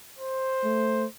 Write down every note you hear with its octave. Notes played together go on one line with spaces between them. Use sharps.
C5
A3